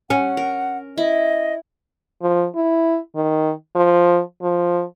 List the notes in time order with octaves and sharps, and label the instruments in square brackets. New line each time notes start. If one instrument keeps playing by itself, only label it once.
[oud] C#4 [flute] F#5
[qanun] A#4
[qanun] E4 [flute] D#5
[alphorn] F3
E4
D#3
F3
F3